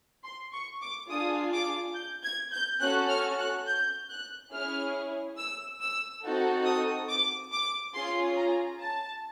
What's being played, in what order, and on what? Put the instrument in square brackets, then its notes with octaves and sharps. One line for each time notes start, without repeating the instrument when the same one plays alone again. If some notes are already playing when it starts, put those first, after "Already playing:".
[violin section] C6
C#6
D6
D4 F4 G#4 D#6
D6
G6
G#6
G6
C#4 F#4 A4 F#6
F6
F#6
G6
F#6
C#4 E4 G#4 F6
E6
E6
C4 D#4 F#4 A4
D#6
D6
D6
C#4 F4 G#4 C6
A#5
A5